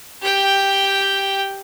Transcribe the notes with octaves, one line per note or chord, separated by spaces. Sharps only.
G4 G5